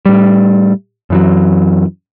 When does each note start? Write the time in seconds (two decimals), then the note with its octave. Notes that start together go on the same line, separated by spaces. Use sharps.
0.06 A2 G3
1.10 F#2 E3 F#3